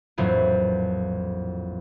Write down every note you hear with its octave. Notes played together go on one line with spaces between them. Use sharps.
A#1 F2 A2 E3 F#3 E4